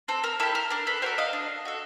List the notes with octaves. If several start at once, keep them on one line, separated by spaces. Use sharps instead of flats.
C4 A4
A#4
E4 G4 A4
A#4
D4 A#4
A4 B4
F#4 A4 A#4 C5
D#5 F5
D4
F#4 A4